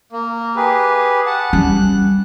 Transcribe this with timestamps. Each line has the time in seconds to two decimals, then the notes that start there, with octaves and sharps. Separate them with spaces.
0.13 A#3
0.56 G4 G#4 B4
1.26 F#5 A5
1.53 G3 C#4 F#6